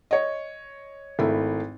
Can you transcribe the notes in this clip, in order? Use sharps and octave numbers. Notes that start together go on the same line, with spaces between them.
C#5 D#5
G#1 A3 E4